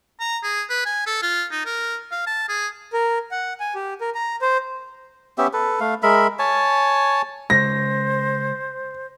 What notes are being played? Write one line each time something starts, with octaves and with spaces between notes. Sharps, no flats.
A#5
G#4
B4
G#5
A4
F4
D#4
A#4
F5
A5
G#4
A#4
F#5
G#5
G4
A#4
A#5
C5
B3 C#4 G4 E5
A4 B4
A3 F5
G#3 A#4 E5 B5
C#5 G#5 A5
C#3 G#3 C5 A#6